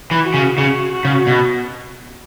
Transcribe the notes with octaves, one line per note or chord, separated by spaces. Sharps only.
E3
F#4
C#3
C#3 F#4
F#4
C#3
B2